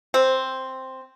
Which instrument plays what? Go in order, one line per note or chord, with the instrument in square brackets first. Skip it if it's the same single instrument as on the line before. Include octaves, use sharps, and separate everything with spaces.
[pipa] C4